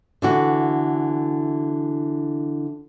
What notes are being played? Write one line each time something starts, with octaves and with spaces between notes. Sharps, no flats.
D3 E3 F#4